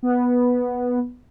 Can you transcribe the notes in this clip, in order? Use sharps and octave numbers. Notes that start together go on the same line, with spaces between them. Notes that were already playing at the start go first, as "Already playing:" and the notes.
B3